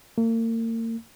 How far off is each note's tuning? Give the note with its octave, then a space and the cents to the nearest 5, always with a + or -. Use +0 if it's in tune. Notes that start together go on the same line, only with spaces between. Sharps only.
A#3 -40